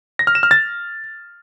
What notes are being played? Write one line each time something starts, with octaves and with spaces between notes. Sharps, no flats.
A#6
F6
E7
F6
A6